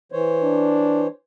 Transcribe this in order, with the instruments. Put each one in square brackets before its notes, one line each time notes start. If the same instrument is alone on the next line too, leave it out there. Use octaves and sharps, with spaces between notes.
[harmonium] E3 C5 C#5
[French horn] D4